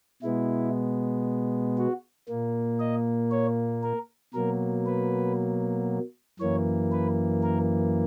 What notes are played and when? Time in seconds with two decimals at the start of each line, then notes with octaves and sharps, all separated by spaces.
0.23 B2 G#3 B3 E4
1.78 F#4
2.28 A#2 A#3
2.80 D#5
3.31 C#5
3.83 A#4
4.34 B2 F#3 A#3 A#4
4.86 B4
6.39 F#2 E3 A#3 C#5
6.92 B4
7.43 A#4